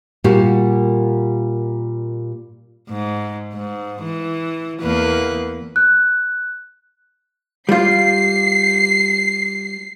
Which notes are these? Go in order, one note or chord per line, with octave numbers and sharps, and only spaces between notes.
A#2 G3 A#3 F#4 G4
G#2
G#2
E3
E2 A#3 B4
F#6
G3 F4 C7